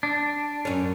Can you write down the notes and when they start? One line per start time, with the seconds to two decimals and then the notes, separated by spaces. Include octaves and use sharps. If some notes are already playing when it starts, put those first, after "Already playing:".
0.03 D4
0.65 F#2 C#4